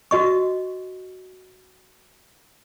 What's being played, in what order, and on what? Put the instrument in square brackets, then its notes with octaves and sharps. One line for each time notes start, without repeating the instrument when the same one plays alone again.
[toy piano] F#4 D#5 C#6